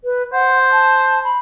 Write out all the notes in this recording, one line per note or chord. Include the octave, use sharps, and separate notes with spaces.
B4
C5 F#5
A5
B5